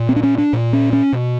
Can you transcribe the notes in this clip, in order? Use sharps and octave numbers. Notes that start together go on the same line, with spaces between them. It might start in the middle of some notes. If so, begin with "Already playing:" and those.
Already playing: A#2
C4
D4
C#4
D4
A#2
C#4
C#4
B2